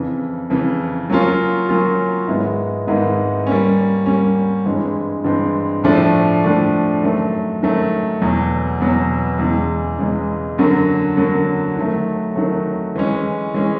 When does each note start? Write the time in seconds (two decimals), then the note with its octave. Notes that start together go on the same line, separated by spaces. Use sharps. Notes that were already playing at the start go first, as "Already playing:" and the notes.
Already playing: F2 C#3 E3
0.50 F2 C#3 E3
1.10 F#3 A#3 C#4 F4
1.69 F#3 A#3 C#4 F4
2.28 G#2 D#3 G#3 B3 E4
2.87 G#2 D#3 G#3 B3 E4
3.47 G3 A#3 C#4
4.06 G3 A#3 C#4
4.65 G2 E3 G#3 C4
5.24 G2 E3 G#3 C4
5.83 A2 F3 A3 D4
6.44 A2 F3 A3 D4
7.02 F#2 D#3 F#3 A3
7.62 F#2 D#3 F#3 A3
8.21 E2 B2 F#3
8.80 E2 B2 F#3
9.39 E2 C#3 E3 G#3
9.99 E2 C#3 E3 G#3
10.58 F#2 D3 F#3 A#3
11.17 F#2 D3 F#3 A#3
11.77 D#3 F#3 A3
12.36 D#3 F#3 A3
12.96 E3 G#3 C#4
13.54 E3 G#3 C#4